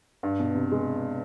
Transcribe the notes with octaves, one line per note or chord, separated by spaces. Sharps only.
G2
B2
C3
G#3